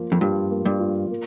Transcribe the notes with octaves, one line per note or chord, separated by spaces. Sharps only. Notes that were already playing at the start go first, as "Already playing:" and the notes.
Already playing: F3 A#3 F4
F2
G2 F4
A#3
G2
F4
A#3